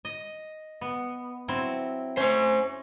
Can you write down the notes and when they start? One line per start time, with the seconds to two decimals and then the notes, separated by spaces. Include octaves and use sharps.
0.05 D#5
0.81 B3
1.48 F#3 C4 E4
2.17 C#4 C5 G#5